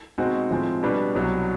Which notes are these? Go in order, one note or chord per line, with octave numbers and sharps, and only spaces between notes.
B2 G#3 C4 D#4 F#4
A2 F3 G#3 C4
B2 G3 B3 D4
C2 B2 F#3